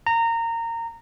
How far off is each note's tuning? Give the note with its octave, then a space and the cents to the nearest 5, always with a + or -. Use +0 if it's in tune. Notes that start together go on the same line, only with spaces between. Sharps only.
A#5 -20